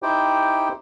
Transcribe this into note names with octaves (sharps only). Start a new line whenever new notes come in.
D#4 E4 G4 C5 G5